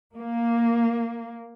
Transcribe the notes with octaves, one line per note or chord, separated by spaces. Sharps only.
A#3